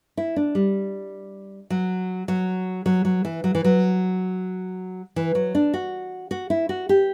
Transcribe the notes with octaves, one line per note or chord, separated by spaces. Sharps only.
E4
D4
G3
F#3
F#3
F#3
F#3
E3
F#3
E3
F#3
E3
F#3
D4
F#4
F#4
E4
F#4
G4